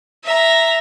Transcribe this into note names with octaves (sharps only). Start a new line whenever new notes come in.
E5 A#5